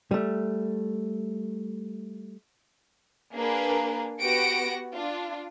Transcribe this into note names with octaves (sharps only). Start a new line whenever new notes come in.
G3 A3
A#3 D4 G#4 A#4 B4
B3 F#4 G4 A#6 C#7 D7
D4 F4